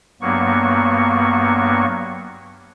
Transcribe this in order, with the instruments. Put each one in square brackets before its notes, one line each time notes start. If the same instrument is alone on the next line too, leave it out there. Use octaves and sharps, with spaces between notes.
[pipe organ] G2 F#3 A#3 B3 C#6